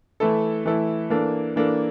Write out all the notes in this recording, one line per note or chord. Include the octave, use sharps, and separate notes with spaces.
E3 A3 E4 A4
E3 A3 E4 A4
E3 A#3 D4 A4
E3 A#3 D4 A4